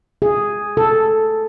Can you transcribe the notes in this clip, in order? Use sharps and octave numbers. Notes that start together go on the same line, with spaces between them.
G#4
A4